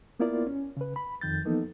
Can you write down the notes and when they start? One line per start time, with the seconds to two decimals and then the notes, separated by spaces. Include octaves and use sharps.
0.20 A#3 B3 E4 F4 A#4 D5
0.47 C#4
0.77 C#3 B4
0.96 B5
1.21 F2 D#3 G6 A6
1.44 E3 F3 A#3 B3 D#4 A4